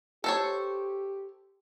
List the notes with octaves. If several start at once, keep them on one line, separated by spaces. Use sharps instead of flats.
G4 A4 C5 C#5